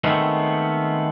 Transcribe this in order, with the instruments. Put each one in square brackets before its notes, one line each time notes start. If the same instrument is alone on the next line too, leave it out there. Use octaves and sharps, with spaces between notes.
[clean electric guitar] D#3 G#3 A3 B3 C4